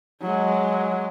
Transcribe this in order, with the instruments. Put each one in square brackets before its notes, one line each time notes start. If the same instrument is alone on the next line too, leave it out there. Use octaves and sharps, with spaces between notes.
[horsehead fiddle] F#3 G#3